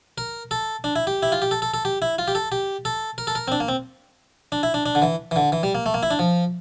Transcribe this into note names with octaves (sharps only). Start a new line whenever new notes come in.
A#4
A4
D4
E4
G4
E4
F4
G4
A4
A4
A4
G4
E4
F4
G4
A4
G4
A4
A#4
A4
A#4
C4
D4
A#3
C4
D4
E4
D4
D4
D3
E3
E3
D3
E3
G3
A#3
A3
A#3
E4
D4
F3